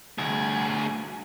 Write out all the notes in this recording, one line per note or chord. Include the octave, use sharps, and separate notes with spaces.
D2 G#4